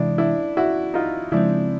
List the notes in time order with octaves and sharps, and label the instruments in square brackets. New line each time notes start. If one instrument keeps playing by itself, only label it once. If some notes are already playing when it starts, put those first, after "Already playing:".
Already playing: [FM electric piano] C3 E3 G#3 [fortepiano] D4 E4
[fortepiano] D4 E4
E4 F#4
D#4 F4
[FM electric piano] C#3 F3 G#3 C4 [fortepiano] D4 E4